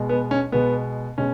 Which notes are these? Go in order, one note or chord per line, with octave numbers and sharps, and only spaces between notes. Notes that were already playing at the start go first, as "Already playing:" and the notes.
Already playing: B2 G#3
B3
C#4
B2 G#3 B3
B2 G#3 C#4